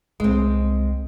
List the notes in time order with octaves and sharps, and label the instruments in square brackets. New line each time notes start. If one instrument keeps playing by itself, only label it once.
[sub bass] C2 [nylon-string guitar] G#3 C4